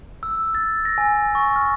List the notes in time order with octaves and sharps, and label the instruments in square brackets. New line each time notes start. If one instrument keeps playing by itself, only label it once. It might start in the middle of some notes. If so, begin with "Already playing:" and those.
[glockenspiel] E6
A6
A#6
G#5
C#6
F6